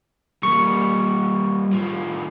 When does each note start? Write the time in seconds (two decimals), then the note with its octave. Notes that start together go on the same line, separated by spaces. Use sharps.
0.43 G3 A#3 C#6
1.72 A2 F3